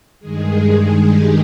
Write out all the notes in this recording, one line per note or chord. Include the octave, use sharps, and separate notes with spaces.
G2 D#3 G#3 G#4
G4